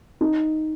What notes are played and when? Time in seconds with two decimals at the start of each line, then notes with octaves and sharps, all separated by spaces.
0.21 D#4